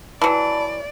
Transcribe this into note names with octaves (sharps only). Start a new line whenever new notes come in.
E3 F#3 D5 A5 B5